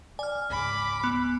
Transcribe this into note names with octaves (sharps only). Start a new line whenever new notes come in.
D5 G#5 F6
C#2 G#2 B5 D6
B3